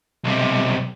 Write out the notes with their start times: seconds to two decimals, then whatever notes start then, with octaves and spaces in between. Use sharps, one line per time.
0.25 B1 C3